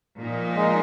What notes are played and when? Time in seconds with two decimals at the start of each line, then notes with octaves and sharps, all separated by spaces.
0.19 A#2 F3 A#3 D#4
0.55 G#3